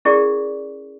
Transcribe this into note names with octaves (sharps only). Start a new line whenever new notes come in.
C#4 E4 G4 G#4 A#4 D5